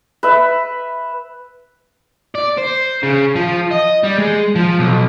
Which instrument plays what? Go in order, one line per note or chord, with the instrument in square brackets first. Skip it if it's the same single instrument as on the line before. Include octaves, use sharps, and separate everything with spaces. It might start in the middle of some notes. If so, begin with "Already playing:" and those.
[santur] B4 E5
[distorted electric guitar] D5
C5
C#3
F3
D#5
G3
G#3
F3
B1